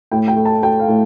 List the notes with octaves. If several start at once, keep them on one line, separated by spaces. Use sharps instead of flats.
A2 G5
G5
A3
A5
A3 G5
F5
A2